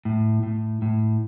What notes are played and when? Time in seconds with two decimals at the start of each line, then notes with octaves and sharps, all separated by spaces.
0.05 A2
0.43 A2
0.82 A2